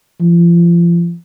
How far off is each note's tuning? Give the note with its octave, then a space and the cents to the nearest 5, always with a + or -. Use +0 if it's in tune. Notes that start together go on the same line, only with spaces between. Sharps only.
F3 -35